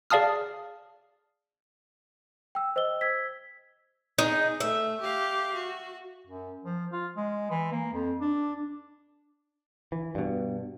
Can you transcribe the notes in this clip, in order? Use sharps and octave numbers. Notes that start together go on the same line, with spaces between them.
G#4 D5 F5 A5 D#6 F6
G5 E6
C5 D#5 E6 G7
E6 G#6 B6
D#4 G#4
A3 E5
G4 F5
F#4
F#2
F3
F4
G#3
E3
A#3
F2
D4
E3
G2 B2